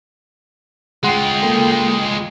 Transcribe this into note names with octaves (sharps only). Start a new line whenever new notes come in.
G#3 F4 G#4 F#5 G5 C6
A#3 A4